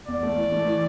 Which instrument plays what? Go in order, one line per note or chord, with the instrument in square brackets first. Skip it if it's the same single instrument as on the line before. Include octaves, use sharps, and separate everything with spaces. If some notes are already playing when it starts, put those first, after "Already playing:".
[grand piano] E2 [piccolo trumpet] D5
[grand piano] A3
E3
A3
E3